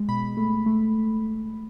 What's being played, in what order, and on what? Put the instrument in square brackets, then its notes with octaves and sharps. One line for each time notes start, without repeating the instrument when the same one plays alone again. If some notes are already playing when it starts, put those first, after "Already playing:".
Already playing: [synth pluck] G#3
B2 B5
A3
A3